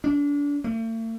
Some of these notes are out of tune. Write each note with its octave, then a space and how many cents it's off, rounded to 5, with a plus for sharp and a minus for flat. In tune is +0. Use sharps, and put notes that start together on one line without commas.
D4 -30
A3 +45